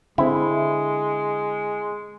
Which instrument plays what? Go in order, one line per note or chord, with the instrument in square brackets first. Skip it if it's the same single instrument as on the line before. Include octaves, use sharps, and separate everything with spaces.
[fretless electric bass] D3 C4 [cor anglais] G#3 [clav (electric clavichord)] E4